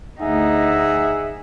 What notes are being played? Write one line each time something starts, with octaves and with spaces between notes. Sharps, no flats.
D2 D#4 G#4 E5 F#5